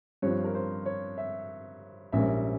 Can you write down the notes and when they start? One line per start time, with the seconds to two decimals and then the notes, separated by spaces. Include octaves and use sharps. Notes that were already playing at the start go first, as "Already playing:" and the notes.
0.22 G2 F3 C4 C#5
0.44 A#4
0.55 C5
0.86 C#5
1.18 E5
2.12 A#1 G#2 G3 A#3 C#4 E5